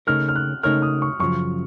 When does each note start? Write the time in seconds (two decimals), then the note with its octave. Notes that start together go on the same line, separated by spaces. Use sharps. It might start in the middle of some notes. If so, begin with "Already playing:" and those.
0.07 C#3 A3 D#4 A#4 C#5 F6
0.29 F6
0.36 F#6
0.63 C#3 A3 D#4 A#4 C#5 F6
0.82 D#6
1.02 C#6
1.20 F#2 C#3 F3 C#6